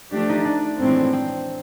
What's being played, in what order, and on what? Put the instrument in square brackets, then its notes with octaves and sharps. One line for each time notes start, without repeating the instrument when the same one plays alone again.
[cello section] F3 A3 D4 G4
[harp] D#4
D4
[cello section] A2 E3 G#3 C4
[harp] C4